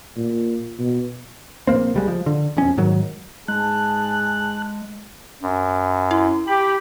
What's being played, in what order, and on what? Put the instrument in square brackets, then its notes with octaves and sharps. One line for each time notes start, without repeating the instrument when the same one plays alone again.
[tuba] A#2
B2
[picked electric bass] A#1 G2 A#3 C4
C#2 G3 G#3
F3
D3
E1 F2 C#4
G#2 D#3 F#3
[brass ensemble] G#2 G#4 A5 [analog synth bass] G#3 [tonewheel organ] F#6
[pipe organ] F#2
[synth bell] E4
[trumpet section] G4 [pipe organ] B5